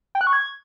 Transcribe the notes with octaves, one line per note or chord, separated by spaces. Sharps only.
G5
F#6
C#6
G#6